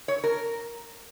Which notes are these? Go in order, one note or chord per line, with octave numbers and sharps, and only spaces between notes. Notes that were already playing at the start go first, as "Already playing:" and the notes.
C#5
A#4